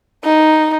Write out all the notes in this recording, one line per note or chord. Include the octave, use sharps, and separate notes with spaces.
D#4